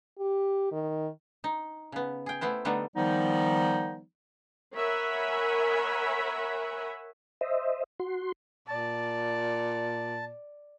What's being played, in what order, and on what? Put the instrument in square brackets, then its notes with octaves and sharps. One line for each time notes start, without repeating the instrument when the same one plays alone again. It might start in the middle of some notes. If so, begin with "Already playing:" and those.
[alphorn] G4
D#3
[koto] D#4
C#3 B3
G#4 G5
A3 B3 E4 C5
D3 G3 A3 B3 D#4
[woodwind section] D#3 F3 G3 B3 D#4
[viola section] A#4 C#5 E5 F#5 G#5 B5
[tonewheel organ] C5 D#5 E5
F#4 C6
[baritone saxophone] A#2 [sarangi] D5 [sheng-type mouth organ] A5